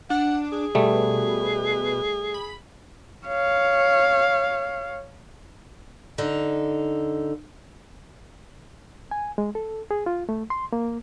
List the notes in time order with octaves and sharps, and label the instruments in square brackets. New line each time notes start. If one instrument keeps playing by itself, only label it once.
[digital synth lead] D4 [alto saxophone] F#5
[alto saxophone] G#4
[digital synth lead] B2 [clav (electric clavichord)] G3 A3
[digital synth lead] B5
[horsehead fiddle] C#5 F5
[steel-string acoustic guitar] D3 D#4
[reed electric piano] G#5
G#3
A4
G#4
F4
A3
C6
A#3